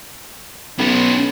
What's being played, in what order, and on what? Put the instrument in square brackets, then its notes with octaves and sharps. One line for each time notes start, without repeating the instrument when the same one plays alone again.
[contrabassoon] B1 [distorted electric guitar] C#4 B4